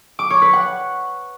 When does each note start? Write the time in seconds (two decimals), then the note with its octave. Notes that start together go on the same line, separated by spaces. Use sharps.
0.19 D6
0.30 C#5
0.42 B4
0.53 F#5